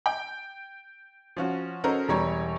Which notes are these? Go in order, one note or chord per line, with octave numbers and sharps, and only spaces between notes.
G5
F3 C#4 F#4
C#4 F#4 A4 A#4 C5 D#5
E1 E2 G3 C#5 A#5